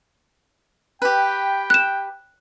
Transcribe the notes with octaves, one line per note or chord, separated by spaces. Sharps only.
G4 B4 G5
F#6 E7